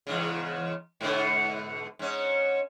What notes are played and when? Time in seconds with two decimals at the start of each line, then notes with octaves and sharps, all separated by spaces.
0.07 E2 G#2 C#3
1.01 G#2 B2 D3
1.99 G#2 C#4